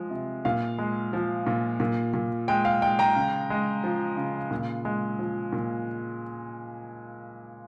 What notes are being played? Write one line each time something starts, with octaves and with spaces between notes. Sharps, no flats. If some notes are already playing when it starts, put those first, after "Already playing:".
Already playing: F3 G#3
C3
A#2 F5
G#3
F3
A#2
A#2
A#2
G#3 G5
F5
G#3 G5
G5 A#5
C#3
G#3
F3
C#3
A#2
G#3
F3
A#2